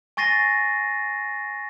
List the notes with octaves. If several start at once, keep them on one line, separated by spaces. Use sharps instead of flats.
G#5 C#6 A6 A#6 C7 D#7